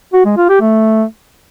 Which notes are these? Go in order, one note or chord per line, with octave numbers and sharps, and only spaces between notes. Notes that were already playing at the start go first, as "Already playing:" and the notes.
F#4
G#3
F4
G4
A3